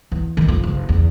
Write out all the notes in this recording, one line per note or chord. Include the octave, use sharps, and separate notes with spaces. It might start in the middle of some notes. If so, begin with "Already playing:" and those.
E2
D#3
F2
F#1
E2